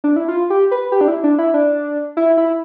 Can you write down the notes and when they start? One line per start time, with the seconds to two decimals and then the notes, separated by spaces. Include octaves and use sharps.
0.04 D4
0.16 E4
0.28 F4
0.50 G4
0.71 B4
0.92 G4
1.01 D4
1.08 E4
1.24 D4
1.38 E4
1.54 D4
2.17 E4
2.37 E4